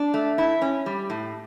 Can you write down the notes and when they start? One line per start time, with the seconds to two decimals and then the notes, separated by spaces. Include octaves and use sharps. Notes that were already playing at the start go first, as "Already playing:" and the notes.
Already playing: D4
0.14 A3
0.38 E4
0.62 C#4
0.86 G3
1.10 A2